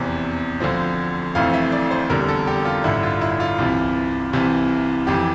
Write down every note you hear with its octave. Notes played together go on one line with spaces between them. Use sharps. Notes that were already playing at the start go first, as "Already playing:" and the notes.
Already playing: F1 E2 C3
D2 D3 F3 C4
F1 F2 E3 A3 C4 F5
E5
D5
C5
F1 E2 D3 G3 A#4
A4
G4
F4
A1 G2 D3 E4
F4
E4
F4
C2 C3 E3
C2 C3 E3
F1 F2 E3 G4